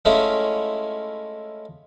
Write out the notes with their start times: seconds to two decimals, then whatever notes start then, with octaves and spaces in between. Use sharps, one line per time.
0.05 G#3 A3 C#4 E4 F4